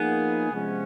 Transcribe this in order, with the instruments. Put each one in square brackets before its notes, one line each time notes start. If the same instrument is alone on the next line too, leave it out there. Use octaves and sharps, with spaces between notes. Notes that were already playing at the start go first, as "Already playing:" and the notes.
Already playing: [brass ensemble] F3 A#3 D#4 G#4 [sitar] B3
[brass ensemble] C3 F3 G#3 C#4